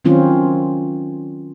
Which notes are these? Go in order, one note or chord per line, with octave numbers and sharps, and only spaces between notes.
D#3 F#3 C4 C#4 F4